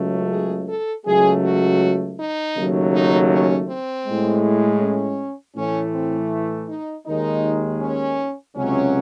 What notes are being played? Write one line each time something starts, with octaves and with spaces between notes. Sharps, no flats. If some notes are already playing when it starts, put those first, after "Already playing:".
Already playing: C#2 C#3 F#3 A3
G#4
A4
C#2 C#3 F#3 A3 G#4
F#4
D#4
D#2 C#3 F#3 A3
D#4
C#4
C4
A2 G#3
C#4
A2 E3 A3 C#4
C4
D#4
D#2 D#3 G#3 D#4
C#4
C#2 C3 F#3 C#4